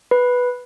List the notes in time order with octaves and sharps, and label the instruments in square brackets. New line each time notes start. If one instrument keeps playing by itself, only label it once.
[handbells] B4